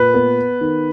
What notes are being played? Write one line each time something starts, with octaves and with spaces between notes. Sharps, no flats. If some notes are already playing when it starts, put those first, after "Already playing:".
Already playing: A#2 B4
B3
D#3